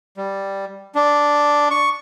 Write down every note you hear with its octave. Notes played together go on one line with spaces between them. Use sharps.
G3
D4
C#6